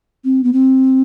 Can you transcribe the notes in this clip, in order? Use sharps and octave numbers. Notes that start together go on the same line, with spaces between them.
C4
B3
C4